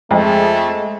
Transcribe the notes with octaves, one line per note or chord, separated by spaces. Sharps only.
F2 G#3 A3